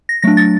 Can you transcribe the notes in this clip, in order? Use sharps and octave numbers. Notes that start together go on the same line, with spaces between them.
A#6
F#3 A3 D4 A#6
A6